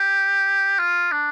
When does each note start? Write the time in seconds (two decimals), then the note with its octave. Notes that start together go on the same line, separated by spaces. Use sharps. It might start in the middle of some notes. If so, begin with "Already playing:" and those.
Already playing: G4
0.79 F4
1.12 D4